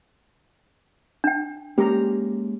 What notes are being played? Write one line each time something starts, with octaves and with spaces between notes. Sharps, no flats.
D4 G5
G#3 A#3 C#4 G4 A#5